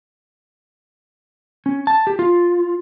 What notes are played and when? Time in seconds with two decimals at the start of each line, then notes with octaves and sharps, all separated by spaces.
1.66 C#4
1.87 A5
2.07 G4
2.19 F4